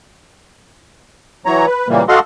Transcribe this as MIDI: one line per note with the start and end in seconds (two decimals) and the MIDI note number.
1.46 1.66 52
1.46 1.66 54
1.46 1.66 73
1.46 1.66 82
1.66 1.88 71
1.89 2.04 46
1.89 2.04 49
1.89 2.04 52
1.89 2.04 55
1.89 2.04 58
2.09 2.19 66
2.09 2.19 69
2.09 2.19 75
2.09 2.19 77
2.09 2.19 78
2.09 2.19 84